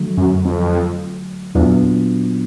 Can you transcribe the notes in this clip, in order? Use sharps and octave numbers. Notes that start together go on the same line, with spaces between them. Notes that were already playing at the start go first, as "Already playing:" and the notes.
Already playing: D3 F#3 A3
F#2
F2
E2 A#2 F#3 B3 D4 F4